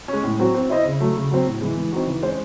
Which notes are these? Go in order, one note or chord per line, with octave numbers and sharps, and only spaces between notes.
G#3 C#4
A2
F#3 C4 F#4
C4
E4 C5 D#5
C#3
F#3 A3
C#3
F#3 C4
A2
E3 G#3
E3
C4 D#4 F#4
E3
G#3 C#4 G#4 C5